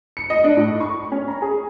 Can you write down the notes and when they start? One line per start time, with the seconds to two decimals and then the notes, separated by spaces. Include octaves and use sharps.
0.17 C#7
0.30 D#5
0.44 D4
0.57 A2
0.80 C#6
1.12 C#4
1.28 A#5
1.42 G#4